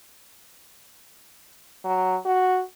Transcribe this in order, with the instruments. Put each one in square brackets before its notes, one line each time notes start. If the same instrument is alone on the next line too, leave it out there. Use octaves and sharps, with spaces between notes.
[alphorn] F#3
F#4